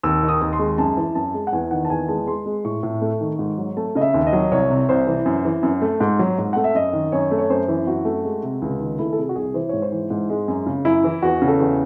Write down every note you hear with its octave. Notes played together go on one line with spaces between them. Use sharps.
D#2 E6
D#3
D#6
D#2
C6
G#3
F#2 A5
E3
F#2 A5
G#3
F#5
E2 G#5
D#3 F#5
A5
E2 G#5
G#3 A5
G#3 C6
G#3
A2 C#6
A2
A3
D#3
G#2
F#3
A3 A5
C#3 D#5
E5
D#2
D#5
F#3
C2 C#5
C3
C2 C5
E3
F#2
E3
F#2
A3
G#2
F#3
G#2
A3 F#5
E5
F#2 D#5
D#3
F#2 C#5
A3
C#5
F#2 C5
E3
F#2 F#4
A3
G#3
C3
C#2
D#3
A3 E4
A4
C3 G#4
F#4
C2 G#4
E3 C5
G#2 C#5
C5
E3
G#2
G#3
F#2
C#3
F#2 E4
E3
E2 F#4
C#3
A4
E2